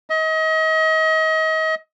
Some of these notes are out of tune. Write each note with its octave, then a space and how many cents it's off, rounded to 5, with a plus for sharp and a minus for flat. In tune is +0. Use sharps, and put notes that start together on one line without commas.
D#5 +35